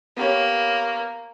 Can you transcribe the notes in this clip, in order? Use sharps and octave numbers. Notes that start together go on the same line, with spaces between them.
A#3 B3 G4 C#5